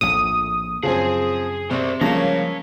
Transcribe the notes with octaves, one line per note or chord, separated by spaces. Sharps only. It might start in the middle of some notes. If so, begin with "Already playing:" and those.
A#1 F2 A2 D#6
F#2 C#3 F3 C4 G#4 G#5
C3 C5 D5
C#3 F3 G3 G#3 A#3 C#5 A5 A#5